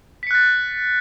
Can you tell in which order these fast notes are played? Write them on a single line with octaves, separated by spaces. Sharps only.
B6 C#7 F#6 A6